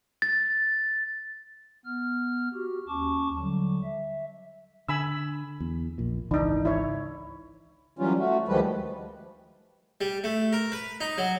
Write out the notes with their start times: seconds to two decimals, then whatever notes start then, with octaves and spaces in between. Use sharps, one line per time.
0.22 A6
1.85 B3 F6
2.54 F#4 G4
2.88 D#2 C#4 A5 C#6 D6
3.37 D3 F#3 G3
3.84 E5
4.89 D3 G#5 B5 E6
5.60 E2
5.98 A#1 A#2
6.31 G#1 C#2 E3 D4 D#4
6.65 E4 C#5
7.99 E3 F#3 G3 C#4 F4
8.19 A3 F#4
8.48 D2 D#3 F3 G3 G#3 B4
10.01 G3
10.24 A3
10.53 A#4
10.72 B4
11.01 D#4
11.18 F#3